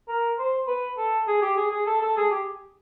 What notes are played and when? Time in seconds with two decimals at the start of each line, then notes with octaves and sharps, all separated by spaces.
0.08 A#4
0.39 C5
0.67 B4
0.98 A4
1.27 G#4
1.42 G4
1.57 G#4
1.71 G#4
1.87 A4
2.02 A4
2.17 G#4
2.31 G4